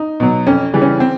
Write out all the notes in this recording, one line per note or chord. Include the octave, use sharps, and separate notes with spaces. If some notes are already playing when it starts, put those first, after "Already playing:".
Already playing: D#4
B2 F#3
F2 C#4
C#3 E3 G3
C#4
C4